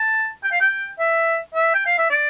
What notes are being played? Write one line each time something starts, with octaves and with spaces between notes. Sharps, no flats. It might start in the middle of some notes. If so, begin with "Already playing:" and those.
Already playing: A5
G5
F5
G5
E5
E5
G5
F5
E5
D5